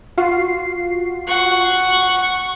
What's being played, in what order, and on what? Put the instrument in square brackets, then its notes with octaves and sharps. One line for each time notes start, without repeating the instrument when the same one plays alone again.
[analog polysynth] F4 F#4 C7
[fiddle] F#5 [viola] C#6